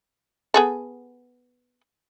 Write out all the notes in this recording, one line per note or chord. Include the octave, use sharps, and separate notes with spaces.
B3 G#4 A4